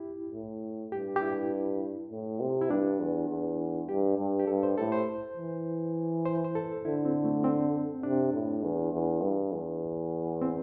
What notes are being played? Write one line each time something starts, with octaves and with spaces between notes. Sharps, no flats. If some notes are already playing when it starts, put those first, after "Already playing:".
Already playing: E4 G4
A2
G2 G4
G4
E4
A2
C3
E4
G2 D4
E2
E2
G2 G4
G2
G4
G2 A4
C5
A2 A4
C5
E3
C5
C5
A4
D3 E4
C4
A3
C4
C3 D4
A2
E2
E2
G2
E2
C4